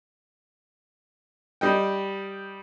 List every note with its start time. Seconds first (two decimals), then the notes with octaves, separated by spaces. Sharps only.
1.61 G3 D#5 G5